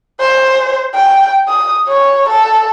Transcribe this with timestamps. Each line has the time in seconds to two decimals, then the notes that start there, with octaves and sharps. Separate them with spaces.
0.20 C5
0.95 G5
1.49 D#6
1.87 C#5
2.29 A4